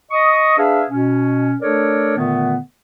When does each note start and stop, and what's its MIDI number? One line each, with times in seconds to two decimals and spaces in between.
0.11 0.55 75
0.11 0.55 85
0.11 0.55 87
0.57 0.83 62
0.57 0.83 68
0.57 0.83 71
0.57 0.83 76
0.57 0.83 77
0.90 1.56 47
0.90 1.56 61
1.61 2.17 57
1.61 2.17 62
1.61 2.17 69
1.61 2.17 70
1.61 2.17 73
1.61 2.17 74
2.17 2.58 46
2.17 2.58 50
2.17 2.58 51
2.17 2.58 57
2.17 2.58 59